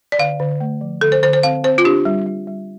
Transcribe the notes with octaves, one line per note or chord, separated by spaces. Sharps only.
D5
D3 F5
D3
A3
F3
D3 A4
C5
D3 C5
C5
C4 F5
C4 C5
F4
D4 G4
G3
G3
G3